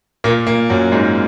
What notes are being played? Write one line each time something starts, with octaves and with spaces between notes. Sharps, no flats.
A#2 A#3
A#2 A#3
F#2 F#3
G#2 G#3